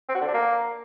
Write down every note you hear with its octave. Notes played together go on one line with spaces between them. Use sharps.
C4
F#4
D3
D4
A#3